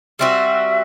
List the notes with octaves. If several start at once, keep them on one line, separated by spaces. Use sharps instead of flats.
G3 C4 F#4 E5